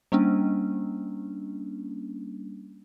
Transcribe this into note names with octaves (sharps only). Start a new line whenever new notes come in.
G3 A#3 C#4 D4